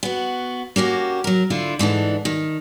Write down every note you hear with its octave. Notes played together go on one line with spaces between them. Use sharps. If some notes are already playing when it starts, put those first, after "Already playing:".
B3 F#4
A#3 C#4 F#4 G4
F#3 A#4
D3 E4 F4
G#2 E3 D4 A4
D#3